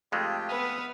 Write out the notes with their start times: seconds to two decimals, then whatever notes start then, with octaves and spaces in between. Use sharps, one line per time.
0.12 F2 G#3 A3 F4 G4
0.48 B3 B4 E5 D#6 F6